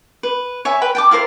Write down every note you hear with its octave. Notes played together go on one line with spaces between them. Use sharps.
B4
C#5 E5 G#5
B4 G5 B5
G5 A5 D6
E4 F4 A#4 C5